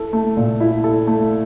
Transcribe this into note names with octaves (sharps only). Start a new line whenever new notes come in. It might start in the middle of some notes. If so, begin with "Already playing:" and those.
Already playing: E4 A4
A3
A#2
E4
A4
A3